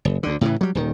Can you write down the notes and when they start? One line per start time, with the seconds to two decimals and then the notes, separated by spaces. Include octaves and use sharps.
0.05 F#1
0.23 D2 D3
0.41 A2 C#3 E3
0.61 F#3 G3
0.75 D#1 D#3